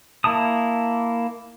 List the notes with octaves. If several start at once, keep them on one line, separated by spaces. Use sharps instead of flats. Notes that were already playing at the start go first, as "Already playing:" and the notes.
A#3 E4 A5 D#6